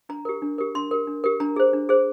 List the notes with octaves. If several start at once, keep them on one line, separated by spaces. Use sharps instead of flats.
D4 A#5
G4 A#4
D4
G4 A#4
D4 C6
G4 A#4
D4
G4 A#4
D4 A#5
G#4 C5
D4
G#4 C5